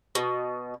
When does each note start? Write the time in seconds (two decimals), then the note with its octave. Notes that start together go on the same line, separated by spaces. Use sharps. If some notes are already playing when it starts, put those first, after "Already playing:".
0.15 B2